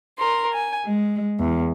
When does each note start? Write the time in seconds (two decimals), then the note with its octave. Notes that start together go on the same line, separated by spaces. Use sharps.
0.19 A#4 C6
0.54 G#5
0.84 G#3
1.38 E2